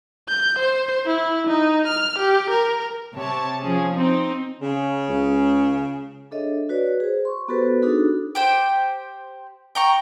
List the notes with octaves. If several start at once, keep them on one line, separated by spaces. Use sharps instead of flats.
G6
C5
E4
D#4
F6
G4
A#4
C3 C#5 A5
F3 C#4 G#4
C4 D#4
C#3
C#2
D4 G#4 A4 C#5 D#5 E5
F#4 B4 C#5 D5
G#4 C5
C6 C#6
B3 F#4 G4 A4 B4 C5
D4 D#4 F#4 G#4 A4
G4 C5 G5
G5 A#5 C#6